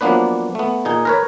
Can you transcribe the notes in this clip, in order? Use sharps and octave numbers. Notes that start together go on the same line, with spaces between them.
F3 F#3 A#3 B3 D4 B4
A3 B3
A#2 D#4 G#4
A#4 B4 C#5